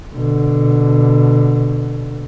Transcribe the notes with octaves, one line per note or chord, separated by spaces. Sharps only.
B2 D3